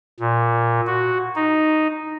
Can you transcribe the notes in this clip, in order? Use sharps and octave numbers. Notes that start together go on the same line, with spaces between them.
A#2
F#4
D#4